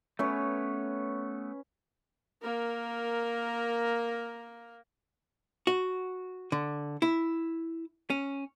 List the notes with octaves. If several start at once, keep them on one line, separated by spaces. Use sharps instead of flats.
A3 B3 C#4 B4 C#5
A#3 A#4
F#4
D3
E4
C#4